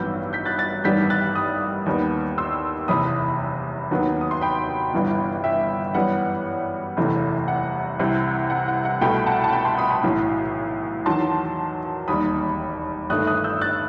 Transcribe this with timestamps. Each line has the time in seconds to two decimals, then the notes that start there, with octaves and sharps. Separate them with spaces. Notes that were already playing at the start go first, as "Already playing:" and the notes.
Already playing: A1 G2 D#3 F#3 B3 E6 G6
0.33 G6 B6
0.45 F#6 A6
0.58 F#6 A6
0.84 A1 G2 D#3 G3 B3 G6 B6
1.10 F#6 A6
1.35 D#6 F#6
1.86 D#2 D#3 G3 B3
2.38 C6 E6
2.88 F#1 E2 C3 B5 D#6
3.91 D#2 D#3 F#3 B3
4.21 D#6
4.31 C6
4.41 G5 B5
4.94 G1 G2 E3 B3
5.44 E5 G5
5.94 F#2 E3 G3 B3 F#5
6.97 F#1 E2 C3 E3 A3
7.48 F#5
7.99 C2 C3 E3
8.50 F#5
8.68 F#5
8.85 F#5
9.01 C2 B2 A3 G5 B5
9.26 F#5 A5
9.44 A5
9.52 G5 B5
9.65 A5 C6
9.78 B5 D#6
9.90 B5 D#6
10.04 B1 A2 E3
11.05 E2 D#3 F#3 A5 C6
12.08 E1 D#2 D#3 G3 B5 D#6
13.09 G1 G2 D#3 A3 D#6 F#6
13.27 D#6 F#6
13.44 E6 G6
13.61 F#6 A6